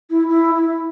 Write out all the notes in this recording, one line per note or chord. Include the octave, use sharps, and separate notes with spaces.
E4
E4
E4